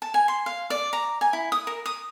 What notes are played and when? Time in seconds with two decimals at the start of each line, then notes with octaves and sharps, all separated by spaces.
0.02 A5
0.14 G#5
0.28 C6
0.46 F5
0.70 D5
0.93 A#5
1.21 G#5
1.33 E4
1.52 D#6
1.67 A#4
1.86 D#6